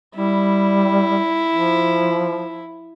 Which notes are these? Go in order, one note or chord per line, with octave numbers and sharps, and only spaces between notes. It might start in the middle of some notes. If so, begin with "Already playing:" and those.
G3 E4
F3